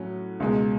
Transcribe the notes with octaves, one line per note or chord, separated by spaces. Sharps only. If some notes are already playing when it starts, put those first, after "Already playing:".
Already playing: A2 F#3 C#4
C#2 B2 G#3